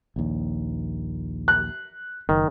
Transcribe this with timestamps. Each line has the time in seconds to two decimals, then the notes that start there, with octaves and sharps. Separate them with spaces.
0.16 A#1 D#2
1.48 F#6
2.29 F#1 D#3